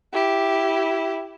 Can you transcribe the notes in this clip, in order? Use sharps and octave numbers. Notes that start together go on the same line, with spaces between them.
E4 G4